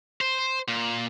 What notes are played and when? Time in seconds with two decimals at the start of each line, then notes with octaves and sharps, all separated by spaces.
0.21 C5
0.68 A#2